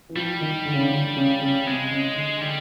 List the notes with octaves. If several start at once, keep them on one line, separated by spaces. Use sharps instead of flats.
E3
F3 G3
D#3
D3
C#3
D3
D3
C#3
C#3
C3 G#3
C#3
D3
D3 G3